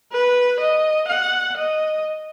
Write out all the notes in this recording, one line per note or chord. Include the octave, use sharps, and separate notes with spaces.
B4
D#5
F#5
D#5